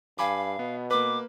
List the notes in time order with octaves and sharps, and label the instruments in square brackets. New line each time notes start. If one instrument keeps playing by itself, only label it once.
[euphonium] G2 [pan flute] F5 [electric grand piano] G#5 B5 D6
[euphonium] B2 [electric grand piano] B3
[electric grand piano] A#3 B4 [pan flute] D6